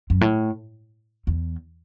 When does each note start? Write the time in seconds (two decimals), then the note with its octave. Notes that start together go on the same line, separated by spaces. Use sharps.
0.10 F#2
0.21 A2
1.27 E2